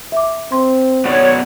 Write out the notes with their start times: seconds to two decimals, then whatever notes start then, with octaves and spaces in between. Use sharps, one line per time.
0.12 E5 D6
0.52 C4 C6
1.05 B3 F#4 C#5 D5